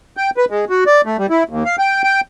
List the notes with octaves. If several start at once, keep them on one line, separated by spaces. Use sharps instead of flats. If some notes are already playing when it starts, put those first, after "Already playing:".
G5
B4
G#3
F#4
D5
A3
G3
E4
D#2
F5
G5
G5